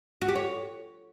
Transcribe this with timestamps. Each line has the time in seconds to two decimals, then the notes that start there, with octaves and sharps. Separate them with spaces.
0.22 F#4
0.28 G4
0.35 C#5